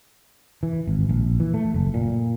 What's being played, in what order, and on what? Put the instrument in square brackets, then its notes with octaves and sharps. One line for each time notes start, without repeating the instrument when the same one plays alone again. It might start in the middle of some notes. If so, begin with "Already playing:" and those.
[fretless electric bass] E3
G#1
A#1
E3
A3
F#1
A#2